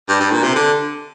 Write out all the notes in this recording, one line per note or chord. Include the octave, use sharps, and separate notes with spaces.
G2
G2
A#2
C3
D3